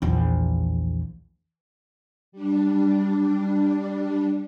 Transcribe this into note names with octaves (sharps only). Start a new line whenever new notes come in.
A#1 E2
G3 D4